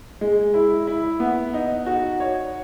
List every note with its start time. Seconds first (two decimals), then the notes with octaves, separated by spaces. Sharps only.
0.21 G#3
0.54 E4
0.87 E4
1.20 B3
1.54 D#4
1.86 F#4
2.20 C#5